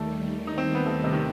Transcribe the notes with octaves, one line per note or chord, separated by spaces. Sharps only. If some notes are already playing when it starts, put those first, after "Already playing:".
Already playing: D#2 D#3 G3 A3
D#4
C4
B3
A3
C3
D#3